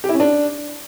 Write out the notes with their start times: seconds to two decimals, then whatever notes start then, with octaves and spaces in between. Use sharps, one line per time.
0.04 G4
0.09 E4
0.14 C#4
0.20 D4